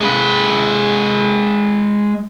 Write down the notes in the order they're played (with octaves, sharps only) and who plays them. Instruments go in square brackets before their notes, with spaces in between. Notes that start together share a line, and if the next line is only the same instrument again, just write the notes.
[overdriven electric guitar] G#3 B4